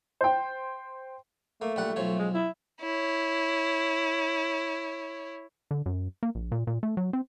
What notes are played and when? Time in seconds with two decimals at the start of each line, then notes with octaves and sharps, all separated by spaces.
0.21 C5 G5
1.62 A3 A#3
1.76 A#1 G3 F#5
1.96 B1 F3 C#5
2.19 G#3
2.34 E4
2.81 E4 C#5
5.71 D3
5.86 F#2
6.23 A#3
6.35 A#1
6.52 A#2
6.67 A#2
6.83 A3
6.97 F#3
7.13 C4